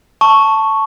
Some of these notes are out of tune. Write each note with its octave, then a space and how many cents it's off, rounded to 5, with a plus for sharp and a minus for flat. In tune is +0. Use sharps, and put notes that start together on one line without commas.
A5 +5 C#6 +0